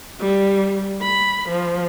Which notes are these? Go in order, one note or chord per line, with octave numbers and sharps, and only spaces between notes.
G3
B5
F3